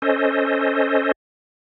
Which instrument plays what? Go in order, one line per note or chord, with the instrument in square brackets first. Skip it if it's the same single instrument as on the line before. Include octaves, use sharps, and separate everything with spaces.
[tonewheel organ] C#4 A4 C5 D#5